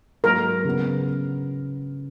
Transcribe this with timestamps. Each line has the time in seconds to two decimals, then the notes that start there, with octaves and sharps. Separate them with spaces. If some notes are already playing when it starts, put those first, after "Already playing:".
0.24 G#2 F#3 A#3 A#4
0.65 C#3 F#3 B3